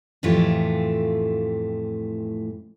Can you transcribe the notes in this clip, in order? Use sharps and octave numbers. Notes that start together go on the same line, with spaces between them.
F2 A2 E3 A3 F4 G4